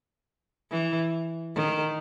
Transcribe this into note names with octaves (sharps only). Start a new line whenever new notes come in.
E3
D#3